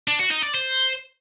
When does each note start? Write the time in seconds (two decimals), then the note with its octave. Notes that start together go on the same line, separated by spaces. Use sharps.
0.08 D4
0.19 F#4
0.31 D#4
0.43 D5
0.54 C5